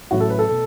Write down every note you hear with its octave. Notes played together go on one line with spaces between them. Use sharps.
A1 A2 F#3 F#4
A4
B4
A4
B2 A3